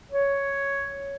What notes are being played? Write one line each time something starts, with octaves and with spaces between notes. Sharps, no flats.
C#5